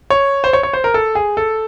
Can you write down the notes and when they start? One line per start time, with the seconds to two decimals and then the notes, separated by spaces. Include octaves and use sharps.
0.10 C#5
0.44 C5
0.53 C#5
0.63 C#5
0.73 C5
0.84 A#4
0.94 A4
1.15 G#4
1.37 A4